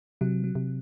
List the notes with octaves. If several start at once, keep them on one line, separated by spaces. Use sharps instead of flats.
C3 F#3
F#3
C3